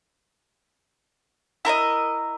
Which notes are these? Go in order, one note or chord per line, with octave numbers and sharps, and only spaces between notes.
E4 A#4 C5 D#5